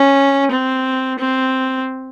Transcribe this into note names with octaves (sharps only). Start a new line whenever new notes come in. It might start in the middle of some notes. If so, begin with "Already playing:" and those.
Already playing: C#4
C4
C4